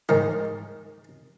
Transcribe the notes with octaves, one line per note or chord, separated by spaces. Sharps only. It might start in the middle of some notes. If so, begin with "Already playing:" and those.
G#2 D#3 A#4